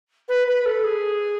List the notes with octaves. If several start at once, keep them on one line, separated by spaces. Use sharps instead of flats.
B4
B4
A4
G#4